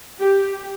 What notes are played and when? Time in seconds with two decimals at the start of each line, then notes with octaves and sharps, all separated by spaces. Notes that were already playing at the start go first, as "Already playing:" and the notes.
0.19 G4